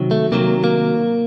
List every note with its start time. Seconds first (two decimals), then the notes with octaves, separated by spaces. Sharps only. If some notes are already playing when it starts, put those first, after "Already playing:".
Already playing: C3 D#3 F#3
0.11 A3
0.32 C3 D#3 F#3 A#3
0.64 A#3